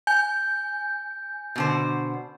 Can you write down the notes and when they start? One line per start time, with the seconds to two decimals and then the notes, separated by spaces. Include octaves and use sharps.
0.07 G#5 G6
1.56 B2 D3 C5